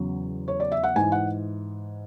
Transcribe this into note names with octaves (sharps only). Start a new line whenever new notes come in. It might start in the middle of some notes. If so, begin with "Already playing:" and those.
Already playing: E2 C#3 F#3
C#5
D5
E5
F#5
G#2 E3 G#5
F#5